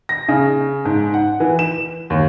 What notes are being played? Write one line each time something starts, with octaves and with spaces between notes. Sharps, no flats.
A#6
C#3
G#2
F#5
E3
E7
D#2